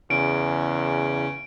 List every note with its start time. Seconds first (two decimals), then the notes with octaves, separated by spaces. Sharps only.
0.10 E2 C#3 C#4 D7